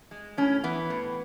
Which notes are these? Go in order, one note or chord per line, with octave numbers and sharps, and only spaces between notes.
G#3
A2 C#4
E3 B3
A2